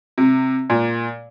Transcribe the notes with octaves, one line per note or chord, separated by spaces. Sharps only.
C3
A#2